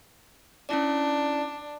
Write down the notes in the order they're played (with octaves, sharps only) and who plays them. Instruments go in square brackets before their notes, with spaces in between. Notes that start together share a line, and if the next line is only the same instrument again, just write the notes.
[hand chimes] C#4 E4 D5 [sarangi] D4